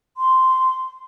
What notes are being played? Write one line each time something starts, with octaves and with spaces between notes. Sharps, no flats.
C6